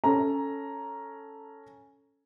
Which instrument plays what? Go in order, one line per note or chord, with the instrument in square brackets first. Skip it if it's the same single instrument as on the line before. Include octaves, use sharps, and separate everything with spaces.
[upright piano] C#4 A4 A#5